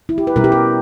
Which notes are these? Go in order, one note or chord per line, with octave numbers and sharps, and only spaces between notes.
E4
G4
B4
B2 G3 C#4 E4 A#4
G4
A#4